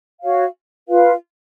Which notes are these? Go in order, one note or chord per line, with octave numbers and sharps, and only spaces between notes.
F#4 C#5 F5
F4 B4 F5